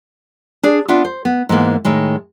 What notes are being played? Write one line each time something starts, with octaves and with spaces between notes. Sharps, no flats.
D4 G#4 D5
B3 D4 F4 E5 F#5
C5
B3
G#2 E3 G#3 A#3 B3
A2 D#3 G#3